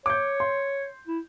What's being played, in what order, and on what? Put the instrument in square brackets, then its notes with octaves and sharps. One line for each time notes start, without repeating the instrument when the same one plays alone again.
[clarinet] C#5 [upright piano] D6 G6
[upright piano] C6
[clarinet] E4